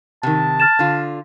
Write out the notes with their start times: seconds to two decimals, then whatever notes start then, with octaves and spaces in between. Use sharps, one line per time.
0.23 C3 D#3 A5
0.60 F6 A6 E7
0.79 D3 F4